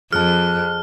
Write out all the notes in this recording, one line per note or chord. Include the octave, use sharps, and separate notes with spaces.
F2 G#4 A5 F6 F#6